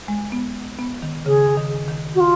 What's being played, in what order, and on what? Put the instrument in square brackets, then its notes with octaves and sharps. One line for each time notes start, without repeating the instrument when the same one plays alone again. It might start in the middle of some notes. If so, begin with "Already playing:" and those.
[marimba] G#3
B3
B3
D#3
[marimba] C#3 [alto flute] G#4
[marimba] D#3
D#3
[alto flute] F#4
F4